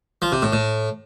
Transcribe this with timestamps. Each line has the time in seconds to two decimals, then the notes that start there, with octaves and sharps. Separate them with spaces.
0.22 F3
0.32 C3
0.42 A2
0.53 A2